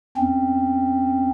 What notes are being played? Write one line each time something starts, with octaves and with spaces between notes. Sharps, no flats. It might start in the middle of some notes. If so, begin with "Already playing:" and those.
E2 C4 C#4